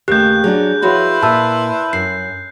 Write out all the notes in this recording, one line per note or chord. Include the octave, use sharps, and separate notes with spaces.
D#2 C#3 A3 G4 F#6 G6
F#3 D4 G#4
F3 E4 F#4 B4 C#5 C6
A#2 E5 A5 E6
F#2 C7